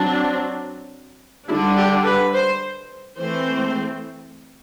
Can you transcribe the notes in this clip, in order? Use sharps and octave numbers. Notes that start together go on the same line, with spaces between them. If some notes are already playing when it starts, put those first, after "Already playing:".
Already playing: F#3 C4 D4
D3 G3 D4 E4
G4
B4
C5
E3 A3 C4 C5